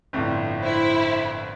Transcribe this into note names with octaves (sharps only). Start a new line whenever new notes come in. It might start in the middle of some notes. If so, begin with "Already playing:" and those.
G1 F2 A2
E4 C5